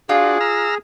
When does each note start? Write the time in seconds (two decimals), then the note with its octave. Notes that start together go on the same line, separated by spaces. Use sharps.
0.09 D4 F4 F#4 G#4
0.40 A#5 E6 F6